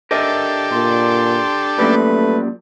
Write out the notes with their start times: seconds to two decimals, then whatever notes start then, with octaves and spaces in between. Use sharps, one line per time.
0.11 D4 G4 A4 A#4 D#5 E5
0.72 A#2 C6
1.79 F#2 A#2 G3 A3 B4